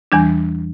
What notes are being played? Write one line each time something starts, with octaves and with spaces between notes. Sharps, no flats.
E2 E3 G3 D4